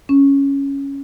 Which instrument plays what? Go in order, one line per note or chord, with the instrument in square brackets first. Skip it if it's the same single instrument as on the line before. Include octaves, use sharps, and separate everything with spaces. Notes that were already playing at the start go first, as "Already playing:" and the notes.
[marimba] C#4